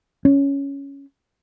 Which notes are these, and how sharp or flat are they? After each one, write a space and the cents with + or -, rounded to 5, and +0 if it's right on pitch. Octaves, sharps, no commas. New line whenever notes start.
C#4 +5